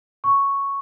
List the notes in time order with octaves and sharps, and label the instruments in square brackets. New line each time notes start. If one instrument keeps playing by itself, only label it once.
[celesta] C#6